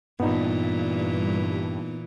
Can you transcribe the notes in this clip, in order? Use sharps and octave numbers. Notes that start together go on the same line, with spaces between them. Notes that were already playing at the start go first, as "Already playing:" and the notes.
G2 A#2 E3 B3 D#4